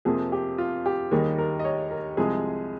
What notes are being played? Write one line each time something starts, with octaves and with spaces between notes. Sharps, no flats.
F2 C3 F3 A#3 G#4
G4
F4
G4
D#2 D#3 G3 A#3 G#4
A#4
D#5
C#5
A#4
C2 C3 F3 G#3 G#4